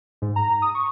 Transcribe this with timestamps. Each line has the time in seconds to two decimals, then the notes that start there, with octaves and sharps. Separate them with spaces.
0.22 G#2
0.36 A#5
0.62 D#6
0.75 C#6